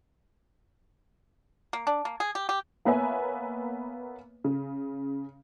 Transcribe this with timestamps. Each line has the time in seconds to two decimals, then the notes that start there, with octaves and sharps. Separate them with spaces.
1.73 A#3
1.87 D4
2.05 A#3
2.20 G#4
2.35 G4
2.49 G4
2.85 A#3 B3 B4 C#5 E5 G#5
4.44 C#3